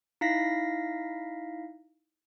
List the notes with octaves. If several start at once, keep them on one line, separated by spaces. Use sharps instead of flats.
D#4 E4 F5 A#6 B6